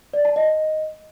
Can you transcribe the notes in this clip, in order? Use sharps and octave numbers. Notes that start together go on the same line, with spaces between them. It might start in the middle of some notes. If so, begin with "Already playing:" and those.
D5
A5
D#5